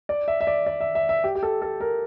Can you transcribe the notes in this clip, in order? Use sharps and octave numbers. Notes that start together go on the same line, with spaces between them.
D5
E5
E5
D5
D5
E5
E5
E5
G4
G4
A4
A4
A#4